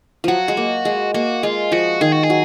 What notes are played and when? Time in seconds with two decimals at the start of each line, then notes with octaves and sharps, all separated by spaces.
0.24 F3 F#3 F#4
0.48 G#3
0.57 A#3
0.85 G#3
1.14 A#3 F#4
1.43 G#3 F4
1.72 F3 F#4
2.01 D#3 G#4
2.12 F#4
2.23 G#4
2.30 F#3